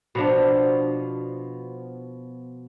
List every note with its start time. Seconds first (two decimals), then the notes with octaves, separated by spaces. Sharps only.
0.15 B2 F3 D4